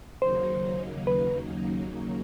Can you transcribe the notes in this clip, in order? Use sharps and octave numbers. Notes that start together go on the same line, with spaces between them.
D#2 C#3 F#3 A#3 D#4 C5
B4